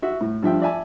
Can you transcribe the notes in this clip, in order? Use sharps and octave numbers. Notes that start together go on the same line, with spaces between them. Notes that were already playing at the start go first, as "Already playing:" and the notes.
F#4 E5 F#5
A2
G2 F3 E5 G5
D5 E5 G#5 A5